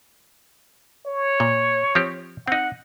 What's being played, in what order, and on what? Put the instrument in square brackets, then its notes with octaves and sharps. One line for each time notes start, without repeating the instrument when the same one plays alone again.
[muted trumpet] C#5
[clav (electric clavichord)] A#2
F3 C4 G4
[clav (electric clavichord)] C4 D#4 [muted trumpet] F#5